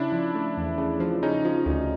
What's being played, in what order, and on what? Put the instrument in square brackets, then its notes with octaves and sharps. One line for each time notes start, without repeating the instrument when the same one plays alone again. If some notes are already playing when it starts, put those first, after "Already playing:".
Already playing: [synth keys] C#3 [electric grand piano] D4 E4
[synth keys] F3
A3
E2
C#3
F3
[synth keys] C#3 [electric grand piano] C#4 D#4
[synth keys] F3
D2